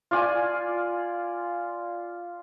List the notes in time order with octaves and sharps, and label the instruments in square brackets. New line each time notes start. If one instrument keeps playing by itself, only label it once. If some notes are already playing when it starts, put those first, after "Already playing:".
[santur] F4 D5 G#5